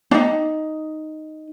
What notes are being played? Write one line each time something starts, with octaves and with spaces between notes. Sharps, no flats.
D4 D#4